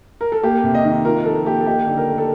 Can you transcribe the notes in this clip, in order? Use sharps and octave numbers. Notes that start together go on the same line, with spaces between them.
A#4
A4
A#3 G4
C3
D#5
D#3
F4 A#4
F3 A4
A#3 G4
A4
D#4 G4
D3
A#4
A3
A4